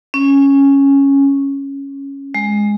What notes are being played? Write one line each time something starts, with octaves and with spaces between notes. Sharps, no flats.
C#4
G#3